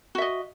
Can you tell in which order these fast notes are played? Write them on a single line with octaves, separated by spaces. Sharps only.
F#4 E5 D#5